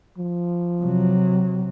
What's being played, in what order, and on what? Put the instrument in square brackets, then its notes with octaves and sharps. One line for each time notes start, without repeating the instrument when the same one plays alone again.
[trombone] F3
[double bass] C3 F#3